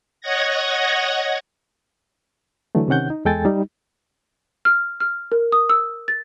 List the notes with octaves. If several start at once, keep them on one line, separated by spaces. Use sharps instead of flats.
C#5 D#5 F#5 G#6 A#6
D3 E3 F#3 A3
C3 D#3 C#4 F#5 G6
D#4
E2 G#3 A4 G5 G#5 A6
G3 D#4
F6
F6
A#4
D#6
E6
A6